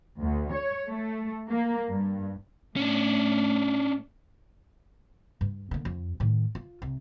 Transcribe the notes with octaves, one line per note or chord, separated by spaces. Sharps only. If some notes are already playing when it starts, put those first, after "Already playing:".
D2
C#5
A3
A#3
G2
A2 A3 C#4 D4
G2
D3 A#3
F2
A2 D#3
F4
C2